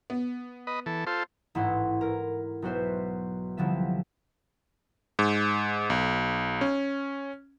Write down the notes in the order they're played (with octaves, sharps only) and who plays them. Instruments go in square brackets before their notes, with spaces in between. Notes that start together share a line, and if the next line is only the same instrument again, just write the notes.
[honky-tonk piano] B3
[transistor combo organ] B4 D#5
E3 A4
F4 A4 C5
[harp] A1 G#2 E4 F#5 C6
A#4
B1 F#4 C5 E5
C2 D3 F3 F#3 E5
[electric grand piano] G#2
B1
C#4